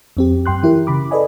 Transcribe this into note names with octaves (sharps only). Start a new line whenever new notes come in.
F2 C4 G4
F#2 G5 C6 F#6
E3 E4 G4 A#4
C#3 B5 D6
A4 B4 D5 D#5 G#5